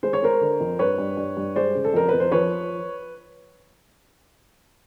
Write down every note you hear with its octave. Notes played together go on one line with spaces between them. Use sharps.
G#3 C5
C#5
G#3 A#4 C5
D3
F2
G2 B4 C#5
G2
G2
G2
G#3 C5 D5
C#3
A4
F2 A#4
F2 B4
C5
F3 B4 C#5